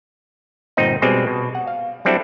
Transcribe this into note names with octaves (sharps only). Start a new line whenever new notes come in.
G1 A#2 C4 D#4 D#5
B2 G3 G#3 C4 G#4
B2
F#5
F5
F#3 G3 C4 D4 E4 A4